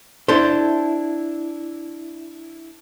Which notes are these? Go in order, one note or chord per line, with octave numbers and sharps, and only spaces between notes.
D4 E4 A4 C5